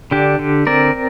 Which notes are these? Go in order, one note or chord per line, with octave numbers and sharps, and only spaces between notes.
D3 D4 G4
D3
C4 A#4 D5